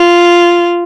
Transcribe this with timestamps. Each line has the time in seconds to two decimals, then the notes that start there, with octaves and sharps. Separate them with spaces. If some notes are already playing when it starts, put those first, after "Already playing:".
Already playing: F4